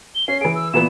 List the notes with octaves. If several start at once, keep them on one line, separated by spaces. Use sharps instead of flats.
G7
C#4 C7
E3 G#4 D7
E6
A#2 E3 B3 E7